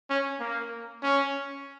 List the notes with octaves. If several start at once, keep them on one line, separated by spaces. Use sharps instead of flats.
C#4
A#3
C#4